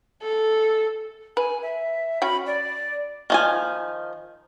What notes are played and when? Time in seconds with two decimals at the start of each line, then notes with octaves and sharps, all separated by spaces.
0.22 A4
1.37 B4 G#5
1.63 E5
2.22 C#4 F#4 G5 B5
2.46 D5
3.30 D#3 F3 G#5